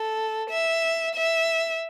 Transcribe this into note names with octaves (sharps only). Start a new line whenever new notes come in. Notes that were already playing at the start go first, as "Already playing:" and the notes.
Already playing: A4
E5
E5